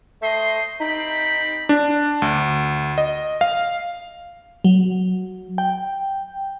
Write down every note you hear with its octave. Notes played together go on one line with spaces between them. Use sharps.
A3 C5 D#5 C6
C4 D#4 G4 B5
D4
D2
D#5
F5
F#3
G5